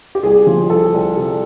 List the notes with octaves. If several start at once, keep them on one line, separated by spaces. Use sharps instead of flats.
G4
C2 G#4
F3
C2 A4
C2
C3